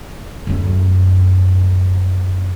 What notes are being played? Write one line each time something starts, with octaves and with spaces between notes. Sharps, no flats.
F#2 A3